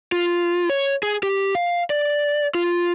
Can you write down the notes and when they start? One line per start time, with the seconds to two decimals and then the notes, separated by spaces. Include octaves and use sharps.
0.12 F4
0.69 C#5
1.03 G#4
1.23 G4
1.55 F5
1.90 D5
2.55 F4